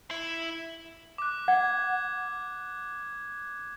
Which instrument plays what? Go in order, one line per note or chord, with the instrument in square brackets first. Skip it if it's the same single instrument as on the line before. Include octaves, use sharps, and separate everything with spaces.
[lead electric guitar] E4
[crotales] D6 F#6
[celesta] F#5 [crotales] G#6